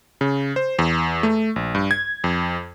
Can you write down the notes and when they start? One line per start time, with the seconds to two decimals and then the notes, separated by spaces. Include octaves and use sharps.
0.21 C#3
0.56 C5
0.79 E2
1.23 A3
1.56 A#1
1.75 G2
1.91 G#6
2.24 F2